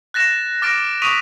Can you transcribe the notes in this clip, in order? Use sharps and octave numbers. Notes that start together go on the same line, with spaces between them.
F#6 A6 A#6 E7
D6 F6 A6 A#6 D7
C#6 D#6 B6 D7 D#7 F7